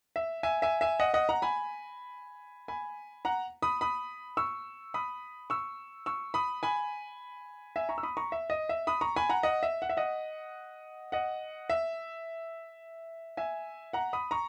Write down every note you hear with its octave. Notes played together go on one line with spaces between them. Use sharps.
E5
E5 G#5
E5 G#5
E5 G#5
D#5 F#5
D#5 F#5
F#5 A#5
G#5 B5
G#5 B5
F#5 A#5
B5 D#6
B5 D#6
C#6 E6
B5 D#6
C#6 E6
C#6 E6
B5 D#6
G#5 B5
E5 G#5
A#5 C#6
E6
B5 D#6
A#5 C#6
E5
D#5
E5
B5 D#6
A#5 C#6
G#5 B5
F#5 A#5
D#5 F#5
E5
F#5
E5
D#5 F#5
D#5 F#5
E5
E5 G#5
F#5 A#5
B5 D#6
A#5 C#6